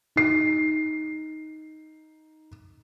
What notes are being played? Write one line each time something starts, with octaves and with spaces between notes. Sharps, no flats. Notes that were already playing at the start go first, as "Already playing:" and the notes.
D#4 C7